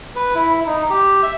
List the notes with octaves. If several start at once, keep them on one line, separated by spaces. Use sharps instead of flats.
B4
E4
D#4
G4
E5